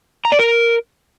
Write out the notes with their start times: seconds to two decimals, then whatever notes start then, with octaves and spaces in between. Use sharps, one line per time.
0.25 A#5
0.32 D5
0.39 A#4